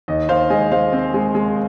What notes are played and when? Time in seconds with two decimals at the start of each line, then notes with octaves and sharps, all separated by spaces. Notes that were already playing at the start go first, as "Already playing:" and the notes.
0.08 D#2 D#5
0.29 D#2 C5 F5
0.50 G#3 D#5 G#5
0.71 G#3 C5 F5
0.93 C4
1.14 G#3
1.35 G#3